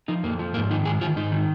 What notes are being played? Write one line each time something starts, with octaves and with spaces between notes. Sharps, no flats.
F3 D#4
F2 A#3
F3
G#2 A#3
D#3 D#4
G#2 G#4
D#3 F4
G#2 D#4
D#3